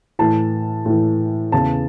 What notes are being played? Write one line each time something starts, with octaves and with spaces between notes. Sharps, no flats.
A2 E3 A5
A2 E3
E2 C#3 E3 A5